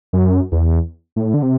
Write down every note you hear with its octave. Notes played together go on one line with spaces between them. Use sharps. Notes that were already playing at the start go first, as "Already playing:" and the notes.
F#2
E2
A2
D3
C3